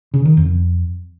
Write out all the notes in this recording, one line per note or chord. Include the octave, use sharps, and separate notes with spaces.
C#3
D#3
F2